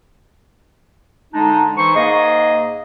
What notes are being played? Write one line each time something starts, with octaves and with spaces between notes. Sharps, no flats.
D3 G#3 D4 D#4
E3 D#4 C5 C#6
G#2 A#3 G#4 D#5